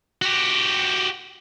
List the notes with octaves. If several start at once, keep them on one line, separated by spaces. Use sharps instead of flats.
F#4 G4